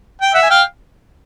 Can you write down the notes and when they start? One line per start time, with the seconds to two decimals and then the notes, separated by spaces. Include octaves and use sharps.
0.22 G5
0.34 E5 F#5
0.43 G#5
0.50 F5 G5